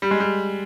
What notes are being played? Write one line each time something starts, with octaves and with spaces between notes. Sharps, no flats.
G3
G#3
G3